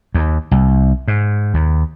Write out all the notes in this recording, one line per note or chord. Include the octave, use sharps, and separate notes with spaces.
D#2
C2
G#2
D#2